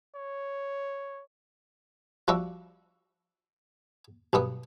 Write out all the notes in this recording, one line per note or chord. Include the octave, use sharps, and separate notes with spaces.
C#5
F3 G3 D4 F#4 E5
B1 G2 B3 D#6